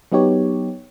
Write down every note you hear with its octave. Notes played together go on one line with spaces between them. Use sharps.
F#3 B3 D#4 G4 C#5